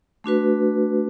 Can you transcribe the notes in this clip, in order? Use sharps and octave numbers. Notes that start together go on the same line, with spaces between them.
A3 D4 F#4 B4